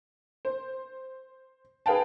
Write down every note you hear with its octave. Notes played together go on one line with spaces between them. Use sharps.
C5
G#4 B4 F5 G5 A5